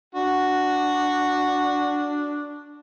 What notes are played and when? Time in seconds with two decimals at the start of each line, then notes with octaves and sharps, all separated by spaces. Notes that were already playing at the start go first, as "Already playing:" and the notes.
0.15 D4 F#4